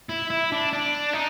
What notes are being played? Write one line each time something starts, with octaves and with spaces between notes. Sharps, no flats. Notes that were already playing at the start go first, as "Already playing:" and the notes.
E4
E4
D4
D4
D#4